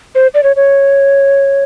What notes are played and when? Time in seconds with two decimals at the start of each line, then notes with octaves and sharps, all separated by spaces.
0.15 C5
0.34 D5
0.43 C#5
0.56 C#5